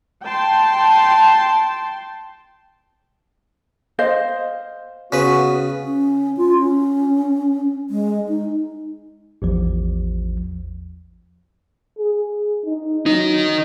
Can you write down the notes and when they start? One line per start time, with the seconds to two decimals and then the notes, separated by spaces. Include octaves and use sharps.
0.24 G5 A5 C6
3.99 C5 D#5 F5
5.12 C#3 B3 F#4 B4
5.84 C#4
6.37 F4
6.59 C#4
7.90 G#3
8.29 D#4
9.42 A1 E2 F3
11.98 G#4
12.66 D#4
13.06 D#3 F#3 D#4